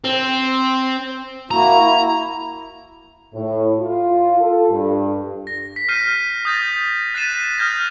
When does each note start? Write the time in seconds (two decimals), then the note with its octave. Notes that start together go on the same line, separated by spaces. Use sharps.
0.04 C4
1.51 A#3 E4 F#4 A#5
1.83 E4
3.34 A2
3.79 F4
4.40 A4
4.70 G2
5.47 A#6
5.76 B6
5.89 F6 G6 C7 D#7
6.45 D#6 G6 A6 A#6
7.14 F#6 A6 B6 C7 D#7 E7
7.58 D#6 F6 G6 G#6 A#6